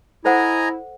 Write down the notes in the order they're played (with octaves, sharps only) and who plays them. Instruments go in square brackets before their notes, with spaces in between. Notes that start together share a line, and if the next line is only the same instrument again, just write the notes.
[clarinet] E4 [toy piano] A4 C5 F#5 [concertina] D#5 G#5 A#5